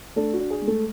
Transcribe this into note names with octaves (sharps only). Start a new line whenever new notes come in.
A3 D4 A4
F#4
D4
G#4
G#3
A3 A4